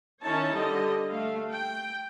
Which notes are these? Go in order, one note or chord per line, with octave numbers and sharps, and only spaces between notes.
D#3 C#4 D#4 E4 C#5 A5
D3 G3 D#5
A3 F5
G5